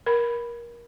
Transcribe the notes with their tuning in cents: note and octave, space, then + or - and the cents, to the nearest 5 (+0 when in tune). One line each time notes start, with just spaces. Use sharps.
A#4 +20 B5 +0